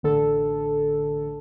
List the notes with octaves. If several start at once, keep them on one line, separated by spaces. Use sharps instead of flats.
A1 D3 A4